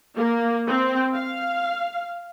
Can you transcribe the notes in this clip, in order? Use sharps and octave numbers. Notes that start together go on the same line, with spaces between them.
A#3
C4
F5